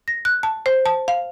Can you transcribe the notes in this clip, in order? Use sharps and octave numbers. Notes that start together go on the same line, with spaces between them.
A#6
F#6
A5
C5
A5
F5